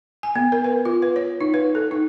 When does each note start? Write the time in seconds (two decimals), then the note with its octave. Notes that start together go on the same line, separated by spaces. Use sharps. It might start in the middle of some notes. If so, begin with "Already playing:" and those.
0.23 G#5
0.36 B3
0.52 A#4
0.64 B4
0.85 F4
1.02 B4
1.16 C#5
1.41 D#4
1.54 B4
1.75 A4
1.91 D#4